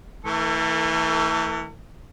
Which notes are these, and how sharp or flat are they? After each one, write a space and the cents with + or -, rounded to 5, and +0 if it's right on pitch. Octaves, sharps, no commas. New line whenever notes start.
E3 -20 A3 +30 A4 +40